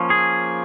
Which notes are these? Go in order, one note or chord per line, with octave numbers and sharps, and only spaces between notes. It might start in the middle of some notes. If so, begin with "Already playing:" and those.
Already playing: F3 A#3 C#4
G#4